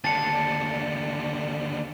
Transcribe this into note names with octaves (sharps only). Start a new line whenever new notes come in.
D#2 D3 A5 A6 C#7